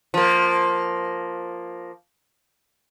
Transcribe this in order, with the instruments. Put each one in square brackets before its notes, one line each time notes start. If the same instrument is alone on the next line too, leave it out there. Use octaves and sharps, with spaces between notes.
[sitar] F3 A#3